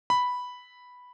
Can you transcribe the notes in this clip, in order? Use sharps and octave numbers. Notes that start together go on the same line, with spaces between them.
B5